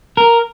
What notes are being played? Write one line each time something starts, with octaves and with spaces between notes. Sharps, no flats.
A#4